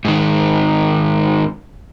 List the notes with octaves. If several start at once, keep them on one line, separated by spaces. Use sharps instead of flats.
G#2 D#3